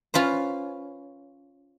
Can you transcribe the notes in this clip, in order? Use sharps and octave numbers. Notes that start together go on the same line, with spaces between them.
C#4 F4 B4 C5